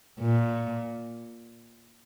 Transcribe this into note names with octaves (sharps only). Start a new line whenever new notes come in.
A#2